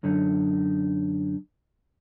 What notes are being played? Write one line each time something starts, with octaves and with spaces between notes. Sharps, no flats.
F#2 D3 D#4